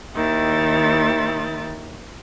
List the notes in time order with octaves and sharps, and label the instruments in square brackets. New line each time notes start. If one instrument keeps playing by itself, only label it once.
[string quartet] D#2 D#3 E4 A6